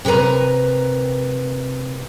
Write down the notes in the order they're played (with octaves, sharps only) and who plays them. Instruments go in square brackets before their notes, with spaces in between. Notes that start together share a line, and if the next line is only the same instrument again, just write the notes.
[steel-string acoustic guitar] C3 G4 A#4 B4 A#5